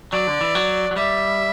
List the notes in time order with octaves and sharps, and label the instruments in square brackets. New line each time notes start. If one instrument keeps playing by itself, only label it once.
[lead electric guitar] F#3 [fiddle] D5
[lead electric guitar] D3
E3
F#3
F#3
[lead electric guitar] G3 [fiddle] E5